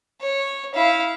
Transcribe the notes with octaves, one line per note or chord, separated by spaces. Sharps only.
C#5
E4 F5